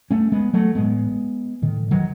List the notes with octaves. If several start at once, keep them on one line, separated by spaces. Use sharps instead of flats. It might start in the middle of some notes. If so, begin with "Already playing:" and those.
A3 C#4
G#3 B3
F#3 A3
A1 A2 G#3 B3
A1 A2 D#3
D#3 F#3